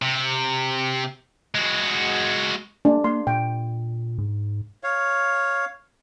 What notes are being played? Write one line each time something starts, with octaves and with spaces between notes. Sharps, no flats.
C3
G#3 F#4
A#3 D4
A#3 C6
A#2 G5
G#2
C#5 F5